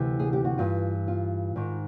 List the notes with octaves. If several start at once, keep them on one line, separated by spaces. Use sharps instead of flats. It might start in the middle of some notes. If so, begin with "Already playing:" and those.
Already playing: D2 C3 E3
G#4
G4
F#4
G2 E3 F4
F4
G#2 D#3